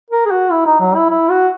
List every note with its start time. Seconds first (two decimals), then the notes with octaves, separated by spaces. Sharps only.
0.10 A#4
0.26 G#4
0.31 F#4
0.51 E4
0.66 D#4
0.80 F#3
0.95 E4
1.10 E4
1.30 F#4